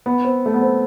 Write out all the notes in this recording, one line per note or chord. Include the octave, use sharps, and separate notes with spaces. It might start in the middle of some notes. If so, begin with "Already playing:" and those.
B3
C4
A3
B3
C4